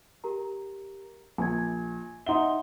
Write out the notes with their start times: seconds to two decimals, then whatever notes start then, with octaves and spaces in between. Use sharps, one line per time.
0.24 G4 A#4 A#5
1.38 A#1 G#5 G#6
2.26 D#4 E5 F#5 C6 G7